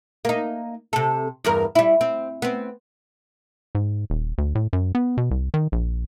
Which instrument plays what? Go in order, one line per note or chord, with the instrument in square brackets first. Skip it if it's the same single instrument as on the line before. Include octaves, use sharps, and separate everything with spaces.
[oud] A#3 D#4
C3 A4
E2 G2 A#4
G3 E4
C4
B3 C4
[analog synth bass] G#2
D#1
D2
A2
F#2
B3
B2
C2
D#3
A#1